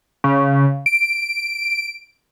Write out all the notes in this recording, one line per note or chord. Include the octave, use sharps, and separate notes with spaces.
C#3
D7